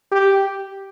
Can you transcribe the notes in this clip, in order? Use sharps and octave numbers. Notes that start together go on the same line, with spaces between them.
G4